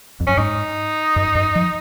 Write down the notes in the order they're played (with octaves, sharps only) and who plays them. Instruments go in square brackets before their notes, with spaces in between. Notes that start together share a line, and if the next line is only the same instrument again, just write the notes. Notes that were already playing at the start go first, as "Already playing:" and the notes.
[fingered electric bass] F2
[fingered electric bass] F#2 [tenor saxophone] C#4
[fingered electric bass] G#2 [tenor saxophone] D#4
[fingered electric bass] F#2
F#2
F3